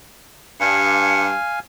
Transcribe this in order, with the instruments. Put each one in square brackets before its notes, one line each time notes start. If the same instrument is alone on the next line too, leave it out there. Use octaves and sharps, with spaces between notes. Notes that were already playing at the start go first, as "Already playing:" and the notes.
[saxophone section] G2 [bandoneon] F5 G#5 [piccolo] C#7